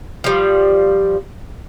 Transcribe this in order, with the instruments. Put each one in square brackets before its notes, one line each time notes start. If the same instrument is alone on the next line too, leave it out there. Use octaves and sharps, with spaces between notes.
[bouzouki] F3 G3